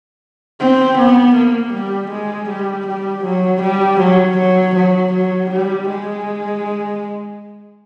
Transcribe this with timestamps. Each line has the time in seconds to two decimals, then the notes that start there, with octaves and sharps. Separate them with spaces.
0.60 C4
0.98 B3
1.36 A#3
1.74 G3
2.11 G#3
2.49 G3
2.87 G3
3.25 F#3
3.62 G3
4.00 F#3
4.38 F#3
4.76 F#3
5.13 F#3
5.51 G3
5.89 G#3